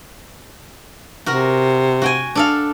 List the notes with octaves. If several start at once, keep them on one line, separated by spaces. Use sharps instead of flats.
C3 F#4 A#4
F#4 G5 G#5
D4 A4 F5